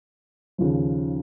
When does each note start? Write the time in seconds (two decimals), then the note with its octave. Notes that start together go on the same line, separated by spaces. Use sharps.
0.58 D#2 C#3 F3